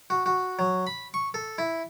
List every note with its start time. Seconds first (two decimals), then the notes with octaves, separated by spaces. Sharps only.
0.10 F#4
0.26 F#4
0.59 F#3
0.87 B5
1.14 C#6
1.34 A4
1.58 E4